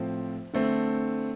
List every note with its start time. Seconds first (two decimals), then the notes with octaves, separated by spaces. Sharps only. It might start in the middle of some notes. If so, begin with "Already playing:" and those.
Already playing: A2 F3 C4
0.54 D3 A3 C4